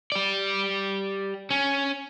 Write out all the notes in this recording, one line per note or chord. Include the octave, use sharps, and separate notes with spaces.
G4 D5
C#4